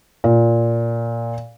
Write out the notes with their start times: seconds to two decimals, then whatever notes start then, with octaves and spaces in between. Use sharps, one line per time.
0.24 A#2